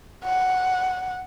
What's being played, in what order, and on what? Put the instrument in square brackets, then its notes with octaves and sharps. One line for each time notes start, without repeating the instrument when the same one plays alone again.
[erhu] F#5